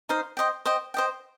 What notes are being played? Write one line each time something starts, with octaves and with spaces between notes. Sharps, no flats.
D#4 C5 F5
C5 D#5 G5
C5 D#5 G5
C5 D#5 G5